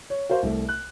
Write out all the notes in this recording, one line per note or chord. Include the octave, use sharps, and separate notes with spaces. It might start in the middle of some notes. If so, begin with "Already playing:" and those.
C#5
F#4 A#4 C5 F5
C2 A3
F#6